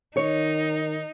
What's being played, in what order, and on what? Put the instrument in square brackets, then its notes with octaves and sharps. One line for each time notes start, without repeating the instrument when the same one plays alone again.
[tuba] D#3 [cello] D#4 [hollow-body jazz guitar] C#5